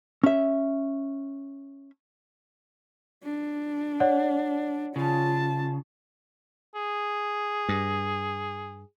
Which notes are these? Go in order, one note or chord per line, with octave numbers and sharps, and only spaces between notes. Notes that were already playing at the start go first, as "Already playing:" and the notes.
C#4 E5
D4
C#5 D5 F#5
C#3 F4 A5
G#4
G2